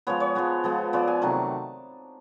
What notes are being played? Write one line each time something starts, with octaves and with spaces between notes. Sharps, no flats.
F3 G#3 B3 C#5
C#5
F3 G#3 B3
F3 G#3 B3
F3 G#3 B3 D5
G#5
C3 D#3 F#3 A3 A5